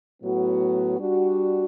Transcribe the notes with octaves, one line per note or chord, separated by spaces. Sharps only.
A2 F#3 B3 F#4
G3 D4 F#4